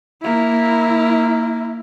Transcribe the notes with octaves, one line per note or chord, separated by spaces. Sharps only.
A#3 E4